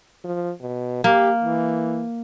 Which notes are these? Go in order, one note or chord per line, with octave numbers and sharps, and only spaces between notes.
F3
B2
A#3 G4
E3